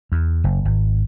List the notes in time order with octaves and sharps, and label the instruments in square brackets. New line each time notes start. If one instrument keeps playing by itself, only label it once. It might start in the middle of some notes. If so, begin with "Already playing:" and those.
[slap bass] E2
F#1
G#1